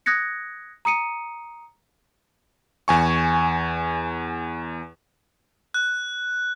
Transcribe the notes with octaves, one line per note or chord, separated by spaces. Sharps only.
D#6 F#6 G#6 A#6 C#7
A#5 D#6 C#7 D#7
E2 G#5 C#6
F#6